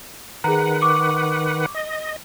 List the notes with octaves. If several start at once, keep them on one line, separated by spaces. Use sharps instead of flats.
D#3 G#4 B4 F#5 A#5
C#6 D6
D#5